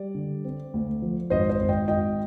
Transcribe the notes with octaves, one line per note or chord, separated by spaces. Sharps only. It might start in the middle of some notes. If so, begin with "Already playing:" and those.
Already playing: G3 D5
D3
C4
D2
F3
G#1 C5 D#5
C5 D#5
G#1
D#5 G5
G#1 D#5 G5